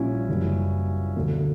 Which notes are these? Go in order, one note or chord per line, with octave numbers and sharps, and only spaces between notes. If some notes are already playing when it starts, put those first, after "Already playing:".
Already playing: A#1 A#2 G3 C#4 E4
F#1 F#2 E3 G3
E1 D2 D3 F#3